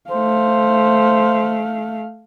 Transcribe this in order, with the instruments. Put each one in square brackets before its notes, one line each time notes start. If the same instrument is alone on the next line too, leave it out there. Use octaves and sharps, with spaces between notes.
[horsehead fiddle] A3 F5 [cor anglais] C5